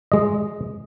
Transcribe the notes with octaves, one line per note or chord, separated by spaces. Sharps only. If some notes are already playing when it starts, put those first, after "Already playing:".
G#3 D#5